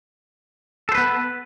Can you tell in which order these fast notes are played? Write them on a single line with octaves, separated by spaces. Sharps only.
A4 C5 B4 B3